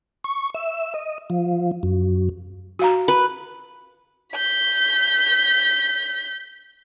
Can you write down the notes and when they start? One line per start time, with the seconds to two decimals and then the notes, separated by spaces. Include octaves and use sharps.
0.24 C#6
0.55 E5
0.94 D#5
1.30 F3
1.83 F#2
2.79 F#4 F5 A#5
3.08 B4
4.34 G6 B6